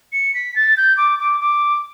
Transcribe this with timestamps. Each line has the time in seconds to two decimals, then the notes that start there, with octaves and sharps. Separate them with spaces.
0.12 C#7
0.34 B6
0.56 A6
0.77 G6
0.97 D6
1.19 D6
1.40 D6